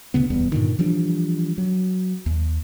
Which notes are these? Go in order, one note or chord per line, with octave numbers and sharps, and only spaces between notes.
D2 C#3 B3
D1 E2 G3 B3
G2 A#2 D3 D#3
E3 F3 G3 D4
F#3
D#2